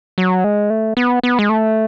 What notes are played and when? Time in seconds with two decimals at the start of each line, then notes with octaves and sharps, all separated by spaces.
0.18 F#3
0.44 G#3
0.70 A3
0.97 B3
1.23 B3
1.39 G#3
1.49 A3